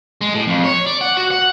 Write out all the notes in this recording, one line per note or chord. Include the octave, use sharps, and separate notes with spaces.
G#3
A2
F2
C#5
D5
F#5
F#4
F#5